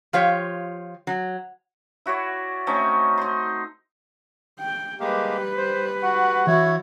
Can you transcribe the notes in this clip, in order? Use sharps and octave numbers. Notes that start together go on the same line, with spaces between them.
F3 F4 G4 C#5
F#3
E4 F#4 C#5 D5
A3 C4 C#4 D#4
D#4 C6
G5
G3 G#3 A#3 G4 B4
C5
F#4 F#5
E3 E4 F#4 C#5